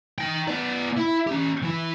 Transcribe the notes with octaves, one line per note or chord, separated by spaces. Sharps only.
D#4 G5
B3 D5
E4
C#4 G4
E3 E4